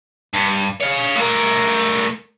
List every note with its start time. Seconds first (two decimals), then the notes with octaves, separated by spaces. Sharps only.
0.33 G2
0.80 C#5 F5
1.15 A2 A#4